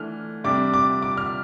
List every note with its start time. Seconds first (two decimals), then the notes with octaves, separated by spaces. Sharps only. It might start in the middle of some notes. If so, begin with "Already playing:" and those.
Already playing: E3 A3 D4 F6
0.44 C3 G3 D4 D6
0.74 D6
1.03 D6
1.17 F6